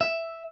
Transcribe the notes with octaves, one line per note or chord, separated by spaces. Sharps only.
E5